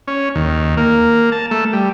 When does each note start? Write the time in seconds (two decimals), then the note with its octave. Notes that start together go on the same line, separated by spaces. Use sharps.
0.07 C#4
0.35 D#2
0.77 A#3
1.32 A5
1.51 A3
1.73 G3